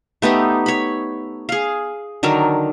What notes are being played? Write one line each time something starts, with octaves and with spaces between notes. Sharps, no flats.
A3 B3 D#4 G4
C#5 B5
G#4 F5
D3 D#3 F#3 A#4